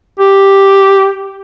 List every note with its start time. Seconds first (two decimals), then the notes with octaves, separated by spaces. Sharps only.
0.19 G4